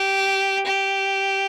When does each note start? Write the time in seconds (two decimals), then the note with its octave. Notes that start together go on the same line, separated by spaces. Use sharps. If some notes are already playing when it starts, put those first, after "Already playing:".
Already playing: G4
0.66 G4